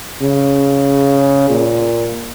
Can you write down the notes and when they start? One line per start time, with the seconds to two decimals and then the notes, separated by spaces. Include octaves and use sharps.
0.23 C#3
1.50 A#2